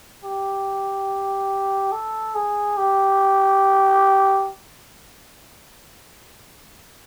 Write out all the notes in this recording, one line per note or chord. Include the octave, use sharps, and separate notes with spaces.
G4
A4
G#4
G4